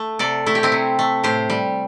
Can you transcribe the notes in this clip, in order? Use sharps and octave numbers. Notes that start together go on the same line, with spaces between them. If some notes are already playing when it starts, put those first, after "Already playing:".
Already playing: A3
C3 A4 D5
A3 E4
G4
C4 E4
C3
A3
A2 G4 C5
G3